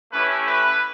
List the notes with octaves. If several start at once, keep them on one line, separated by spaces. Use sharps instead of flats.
A3 C#4 E4 G4 B4
B4